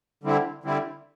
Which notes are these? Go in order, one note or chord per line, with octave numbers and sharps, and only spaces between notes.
D3 G3 C4 E4
D3 G3 C4 E4